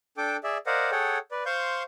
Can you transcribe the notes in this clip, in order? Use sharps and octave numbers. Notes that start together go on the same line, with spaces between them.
D4 A4 G5 D6
G#4 D5 E5
A#4 C5 D5 D#5 F5 F#5
G#4 A4 C#5 F#5 G5
B4 D5
C5 F5 C6 C#6 G6